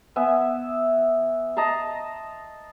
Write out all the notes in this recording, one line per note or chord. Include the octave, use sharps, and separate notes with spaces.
B3 E5 G#5
D#5 A5 A#5 C6